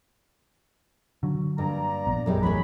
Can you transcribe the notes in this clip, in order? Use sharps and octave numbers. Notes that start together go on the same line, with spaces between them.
D3 F#3
G2 A#3 D5 A#5
A#1 B3
F#2 G3 G#3
E2 A2 E3 F#3 G#3 C#4 B5